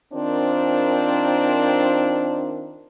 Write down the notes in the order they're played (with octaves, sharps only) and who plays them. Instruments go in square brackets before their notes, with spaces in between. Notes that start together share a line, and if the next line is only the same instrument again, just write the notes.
[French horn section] D#3 C4 D4 F4 A#4 C5